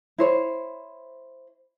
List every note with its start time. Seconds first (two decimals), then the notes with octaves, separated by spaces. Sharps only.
0.18 E4 C5 C#5